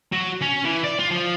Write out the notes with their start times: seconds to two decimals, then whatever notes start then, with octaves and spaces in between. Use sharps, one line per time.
0.12 F#3
0.42 C#4
0.64 E3
0.84 D5
0.99 F4
1.11 F3